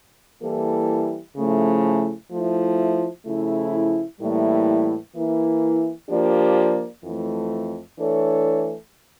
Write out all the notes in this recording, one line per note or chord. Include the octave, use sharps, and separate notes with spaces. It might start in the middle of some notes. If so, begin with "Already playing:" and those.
E3 G3 A#3 E4 A4
C#3 F3 A3 E4
F3 A3 E4
C#3 F3 A3 E4
A2 E3 G3 A#3 E4
E3 A#3 E4
F3 A#3 D4 G4 D5
F2 E3 A3
E3 A3 D4 A4 C#5